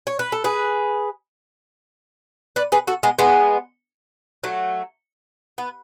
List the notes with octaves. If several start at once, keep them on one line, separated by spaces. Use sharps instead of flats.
C#5
B4
A4
G#4 B4
B4 D5
G#4 B4
F#4 A4
G#3 B3
G#3 B3
F#3 A3
B3